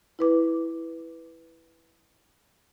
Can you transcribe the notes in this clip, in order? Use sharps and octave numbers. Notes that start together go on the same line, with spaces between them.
E4 B4 D6